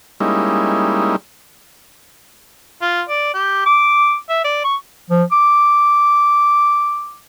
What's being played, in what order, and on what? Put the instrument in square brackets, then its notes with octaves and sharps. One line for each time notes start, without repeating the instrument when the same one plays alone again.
[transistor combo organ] G3 G#3 A#3 C#4 D#4 E4
[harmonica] F4
D5
G4
D6
E5
D5
C#6
[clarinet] F3
D6